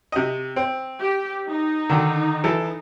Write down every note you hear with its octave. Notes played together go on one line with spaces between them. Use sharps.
C3 D#5
C4
G4
D#4
D3 D#3
E3 A4